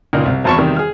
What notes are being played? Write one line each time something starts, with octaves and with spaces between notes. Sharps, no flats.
C#2 A#2 D#4 A#4
C2
G#1 E2 C5 A5 B5 C#6
E2 C3 D#3 G3
G#4 F6